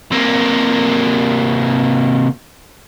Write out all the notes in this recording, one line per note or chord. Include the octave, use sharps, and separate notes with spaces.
C3 A#3